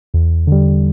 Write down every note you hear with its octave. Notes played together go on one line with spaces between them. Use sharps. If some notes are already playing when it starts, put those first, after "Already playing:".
E2
D3 G3